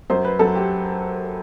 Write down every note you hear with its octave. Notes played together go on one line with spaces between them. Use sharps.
F#2 C5
B4
F#2 A4
G4